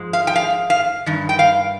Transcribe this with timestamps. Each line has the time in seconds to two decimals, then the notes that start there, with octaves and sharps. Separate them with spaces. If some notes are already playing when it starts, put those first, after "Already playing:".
Already playing: G#2 F3 G#3
0.13 F5
0.27 G5
0.36 F5
0.70 F5
1.06 G2 D#3
1.29 G5
1.39 F5